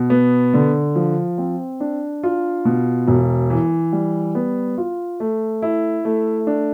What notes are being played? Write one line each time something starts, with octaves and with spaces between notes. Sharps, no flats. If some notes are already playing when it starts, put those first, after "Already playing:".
Already playing: B2
B3
D3
F3
C4
D4
F4
B2
E1
E3
G3
B3
F4
A3
E4
A3
D4